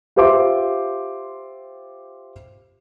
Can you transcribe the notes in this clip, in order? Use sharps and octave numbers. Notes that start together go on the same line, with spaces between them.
F4 G4 C5 E5 D6